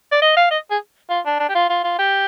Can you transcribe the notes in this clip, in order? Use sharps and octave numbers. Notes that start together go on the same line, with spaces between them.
D5
D#5
F5
D#5
G#4
F4
D4
D4
G4
F4
F4
F4
G4